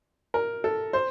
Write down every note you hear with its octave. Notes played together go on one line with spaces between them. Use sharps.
A#4
A4
C5